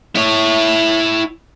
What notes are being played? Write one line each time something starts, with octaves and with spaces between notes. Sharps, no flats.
E4 C#5